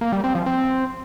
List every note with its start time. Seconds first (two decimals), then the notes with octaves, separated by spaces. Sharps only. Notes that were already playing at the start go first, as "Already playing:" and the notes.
0.01 A#3
0.12 G3
0.24 C4
0.35 F3
0.46 C4